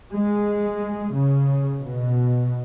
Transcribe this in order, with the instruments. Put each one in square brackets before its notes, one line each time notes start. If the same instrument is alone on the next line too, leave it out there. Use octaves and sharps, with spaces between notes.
[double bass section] G#3
C#3
B2